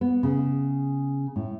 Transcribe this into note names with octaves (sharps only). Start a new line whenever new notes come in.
B3
C#3
A2